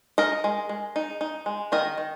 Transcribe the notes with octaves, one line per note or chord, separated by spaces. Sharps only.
D#4 A#4 D#5
G#3
G#3
D#4
D#4
G#3
D#3 A#4 D#5
D#3